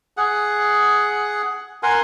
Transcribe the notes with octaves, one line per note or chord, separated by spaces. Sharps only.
G#4 F#5
A#4 F#5 G#5 C6